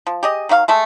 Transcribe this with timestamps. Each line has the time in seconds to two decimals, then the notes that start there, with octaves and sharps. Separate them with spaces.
0.07 F3
0.23 G4 G#4 D#5
0.49 D#3 F#3 F#4 F5
0.68 G#3 A3 A4